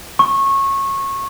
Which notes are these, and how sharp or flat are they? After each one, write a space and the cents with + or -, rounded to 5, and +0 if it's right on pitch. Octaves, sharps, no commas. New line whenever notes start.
C#6 -20